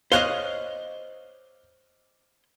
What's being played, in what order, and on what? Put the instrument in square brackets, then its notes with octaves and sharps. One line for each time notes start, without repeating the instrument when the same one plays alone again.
[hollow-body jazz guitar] C5 C#5 D#5 [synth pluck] F5 F#6 [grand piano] G7